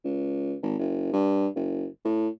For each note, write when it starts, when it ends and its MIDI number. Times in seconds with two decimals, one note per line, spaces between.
0.04 0.54 37
0.62 0.75 32
0.79 1.12 30
1.13 1.47 43
1.55 1.86 30
2.05 2.28 45